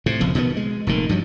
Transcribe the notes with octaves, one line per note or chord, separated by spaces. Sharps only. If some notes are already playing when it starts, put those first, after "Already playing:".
A2 C3
F#1 B1 F2 F3
B2 D#3 G#3 B3
G#3
F1 A#2 D#3
G2 F3 F#3